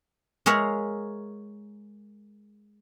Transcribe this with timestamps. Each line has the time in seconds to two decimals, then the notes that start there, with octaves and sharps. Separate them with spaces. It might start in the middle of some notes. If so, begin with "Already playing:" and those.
0.46 G#3 G#4 A#4 C#5 E5 F5